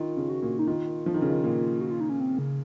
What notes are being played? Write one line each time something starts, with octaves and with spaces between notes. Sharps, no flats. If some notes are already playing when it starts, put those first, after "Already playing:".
Already playing: D#3 F4
C#3
F#4
A#2
D#4
D#3 F4
F3
D#3
C#3
D#3
A#2
F#4
F4
D#4
C#4
C4
C#3